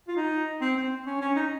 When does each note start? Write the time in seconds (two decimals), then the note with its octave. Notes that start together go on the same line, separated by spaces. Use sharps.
0.08 F4
0.16 D#4
0.61 C4
0.76 C4
1.06 C#4
1.21 C#4
1.36 D#4